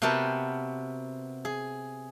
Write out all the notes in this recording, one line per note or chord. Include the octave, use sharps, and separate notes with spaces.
C3 B3 F#4 A#4 G5 A5
G#4